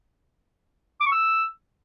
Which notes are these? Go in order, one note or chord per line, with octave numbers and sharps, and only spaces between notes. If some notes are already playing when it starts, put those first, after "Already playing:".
D6
C#6
E6